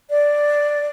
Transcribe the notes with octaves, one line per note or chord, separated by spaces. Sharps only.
D5